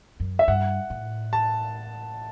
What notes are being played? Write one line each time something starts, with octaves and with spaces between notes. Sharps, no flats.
F#2
E5
G2 F#5
A2
A5